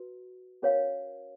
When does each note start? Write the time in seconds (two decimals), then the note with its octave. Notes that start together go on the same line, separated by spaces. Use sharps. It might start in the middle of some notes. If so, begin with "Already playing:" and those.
Already playing: F#4 B4
0.62 C#4 F#4 A#4 C#5 F5